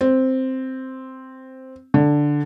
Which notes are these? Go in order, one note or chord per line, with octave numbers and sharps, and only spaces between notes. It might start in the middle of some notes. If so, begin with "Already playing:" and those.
C4
D3